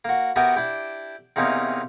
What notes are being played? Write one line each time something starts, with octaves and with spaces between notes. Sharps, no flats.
A#3 F#4
B3 F#4 G4 A#4 E5 G#5
D4 E4 G4
E2 C3 A#3 C#4 D#4